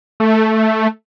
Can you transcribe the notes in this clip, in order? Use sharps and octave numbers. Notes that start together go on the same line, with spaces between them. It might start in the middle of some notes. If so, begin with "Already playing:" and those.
A3